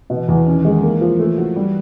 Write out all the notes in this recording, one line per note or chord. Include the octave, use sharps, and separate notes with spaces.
B2 E3
E2
D#3 C#4
G#3
E3 A#3
F3
A3
F#3
G3